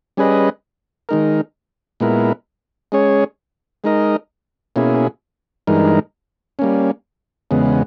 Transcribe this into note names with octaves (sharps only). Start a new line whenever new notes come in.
G3 C#4 G#4 B4 D#5
D#3 G#3 D#4 A#4
A#2 G#3 B3 E4 A#4
G#3 C#4 G#4 C#5
G#3 D#4 A#4 D#5
B2 A#3 C#4 E4 G#4
G2 E3 G#3 D#4 A#4
G3 A#3 C#4
E2 C#3 G#3 B3